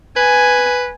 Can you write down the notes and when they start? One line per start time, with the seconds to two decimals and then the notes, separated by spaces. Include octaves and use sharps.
0.16 B4 G#5